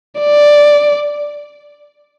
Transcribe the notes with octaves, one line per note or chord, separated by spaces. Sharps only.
D5